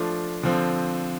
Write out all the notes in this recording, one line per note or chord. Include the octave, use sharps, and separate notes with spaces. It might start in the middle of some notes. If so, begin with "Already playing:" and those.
Already playing: F3 A3 D4 F4
D3 F3 C4